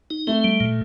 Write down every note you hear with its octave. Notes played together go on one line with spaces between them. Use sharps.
D#4
A3 C4
G3
A#2